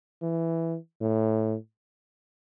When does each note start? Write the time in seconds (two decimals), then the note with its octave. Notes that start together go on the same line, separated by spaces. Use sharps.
0.22 E3
1.01 A2